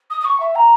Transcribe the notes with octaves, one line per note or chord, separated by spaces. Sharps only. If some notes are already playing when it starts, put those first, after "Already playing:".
D#6
D#6
C#6
E5
A#5